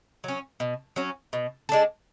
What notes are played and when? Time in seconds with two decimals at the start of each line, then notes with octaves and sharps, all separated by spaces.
0.24 F#3 C#4
0.60 B2
0.96 F#3 C#4
1.33 B2
1.69 G#3 D4 A4